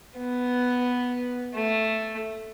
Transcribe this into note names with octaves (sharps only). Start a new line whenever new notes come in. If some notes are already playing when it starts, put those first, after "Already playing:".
B3
A3